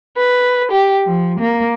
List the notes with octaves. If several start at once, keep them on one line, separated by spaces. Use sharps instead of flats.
B4
G4
F3
A#3